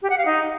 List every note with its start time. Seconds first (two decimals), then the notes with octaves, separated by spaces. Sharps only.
0.02 G4
0.10 F#5
0.18 F5
0.26 D#4